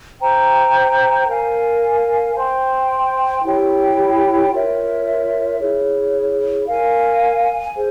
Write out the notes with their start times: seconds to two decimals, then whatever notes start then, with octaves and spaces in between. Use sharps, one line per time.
0.20 C5 G5 A#5
1.28 A#4 F5 G#5
2.35 C5 G5 C6
3.43 E4 G4 C#5 G5
4.51 F4 A#4 C#5 E5
5.59 E4 G#4 C#5
6.67 A#4 F5 G#5
7.75 G#4 C5